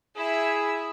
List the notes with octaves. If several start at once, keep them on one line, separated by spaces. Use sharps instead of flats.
E4 G#4 E5